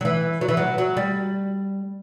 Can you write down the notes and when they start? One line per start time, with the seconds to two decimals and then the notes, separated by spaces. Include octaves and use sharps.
0.01 F#3
0.05 E3
0.41 F#3
0.49 E3
0.57 F#3
0.78 F#3
0.97 G3